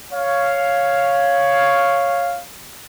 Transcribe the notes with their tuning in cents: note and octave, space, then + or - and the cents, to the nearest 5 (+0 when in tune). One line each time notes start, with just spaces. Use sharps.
C#5 +0 F5 +0